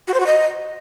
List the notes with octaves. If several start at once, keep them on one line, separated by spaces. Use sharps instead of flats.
F#4
C5
F#4
D#5